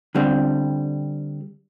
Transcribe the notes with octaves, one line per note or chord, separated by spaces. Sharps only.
D3 G3 C4